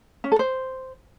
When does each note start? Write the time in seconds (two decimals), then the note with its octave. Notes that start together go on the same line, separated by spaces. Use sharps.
0.24 C#4
0.32 A4
0.39 C5